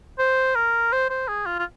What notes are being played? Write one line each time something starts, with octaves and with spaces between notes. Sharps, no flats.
C5
A#4
C5
C5
G#4
F4
F4